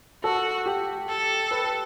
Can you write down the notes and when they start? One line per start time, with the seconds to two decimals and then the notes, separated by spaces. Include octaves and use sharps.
0.24 F#4 A4
0.66 G4
1.09 A4
1.51 B4